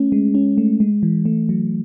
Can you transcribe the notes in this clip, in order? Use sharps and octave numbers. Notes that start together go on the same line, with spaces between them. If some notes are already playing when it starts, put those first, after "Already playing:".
Already playing: A3 C#4
G#3
C#4
A3
G#3
E3
A3
F#3